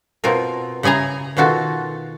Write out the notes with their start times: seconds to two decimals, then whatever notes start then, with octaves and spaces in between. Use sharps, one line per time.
0.24 B2 C4 F4 A#4
0.83 C#3 E4 G#4 G#5 A#5
1.37 B2 D#3 F4 F#4 A4